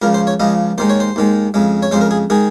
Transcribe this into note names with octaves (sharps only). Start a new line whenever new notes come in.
C#2 C#3 F3 A#4
C5
C#5
C#2 C#3 F3 D#5
D#2 D#3 G#3 C5
C#5
C5
D#2 D#3 G#3
F2 C#3 G#3
C#5
F2 C#3 G#3 C5
A#4
G#4
D#3 G#3 G#4